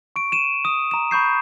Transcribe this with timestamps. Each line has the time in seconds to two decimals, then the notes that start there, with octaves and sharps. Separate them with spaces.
0.16 C#6 D7
0.32 D#7 E7
0.65 D#6
0.91 A#5 E7
1.11 B5 C#6 G6 C7